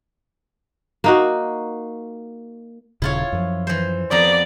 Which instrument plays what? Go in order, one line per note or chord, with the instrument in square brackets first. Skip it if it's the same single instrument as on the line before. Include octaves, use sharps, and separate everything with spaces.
[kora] A#3 D#4 F#4
[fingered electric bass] D#1 C#3 [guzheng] E4 F4 C#5
[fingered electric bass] F#2 F3
[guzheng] E3 C5
[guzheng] F2 B3 A#5 [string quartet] D5